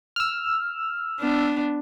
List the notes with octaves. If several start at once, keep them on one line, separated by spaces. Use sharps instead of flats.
E6 F6
B3 D4